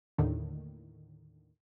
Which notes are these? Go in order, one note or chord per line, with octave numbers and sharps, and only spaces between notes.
D#2 A2 D3 D#3